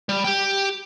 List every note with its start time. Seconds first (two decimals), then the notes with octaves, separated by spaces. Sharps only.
0.09 G3
0.24 G4 G5